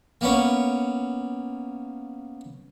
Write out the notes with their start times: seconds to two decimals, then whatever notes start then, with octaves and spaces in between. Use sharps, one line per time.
0.21 A#3 B3 C#4